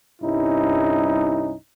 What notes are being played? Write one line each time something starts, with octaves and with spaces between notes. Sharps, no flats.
C2 G2 C#4 D#4 E4